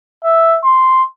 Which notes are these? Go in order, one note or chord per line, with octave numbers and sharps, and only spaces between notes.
E5
C6